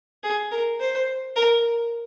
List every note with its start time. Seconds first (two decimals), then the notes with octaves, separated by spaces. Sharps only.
0.23 G#4
0.51 A#4
0.80 C5
1.36 A#4